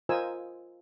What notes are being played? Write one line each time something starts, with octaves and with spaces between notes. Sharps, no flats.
F4 A#4 C5 D#5 G#5 E6